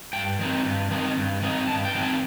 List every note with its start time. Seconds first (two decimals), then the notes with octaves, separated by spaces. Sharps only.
0.13 G2 G5
0.39 D#3 F#3 C4 D#4
0.65 G2
0.90 D#3 F#3 C4 D#4
1.17 G2
1.42 D#3 F#3 C4 D#4
1.68 G2 A5
1.85 G5
1.94 D#3 F#3 C4 D#4
2.03 A5